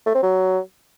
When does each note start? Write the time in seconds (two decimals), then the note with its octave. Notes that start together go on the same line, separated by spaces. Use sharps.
0.06 A3
0.14 C4
0.23 F#3